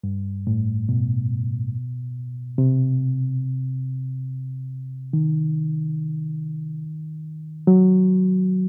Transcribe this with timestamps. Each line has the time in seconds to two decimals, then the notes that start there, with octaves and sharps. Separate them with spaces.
0.04 G2
0.47 A2
0.89 B2
2.58 C3
5.13 D#3
7.67 F#3